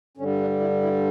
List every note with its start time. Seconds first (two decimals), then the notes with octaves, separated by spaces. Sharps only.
0.17 G2 D3 G3 C#4
0.39 D4
0.60 E4
0.82 E4